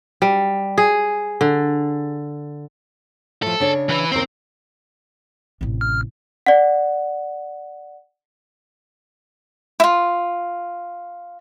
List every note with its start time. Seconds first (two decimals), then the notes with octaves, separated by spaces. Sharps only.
0.22 G3
0.78 G#4
1.41 D3
3.42 A2 F3 A4
3.60 C#3 D4 C#5
3.89 E3 B4
4.12 D#2 C#3 C4 A#4
5.61 A1 C3
5.81 F6
6.46 D5 F#5
9.80 E4 F4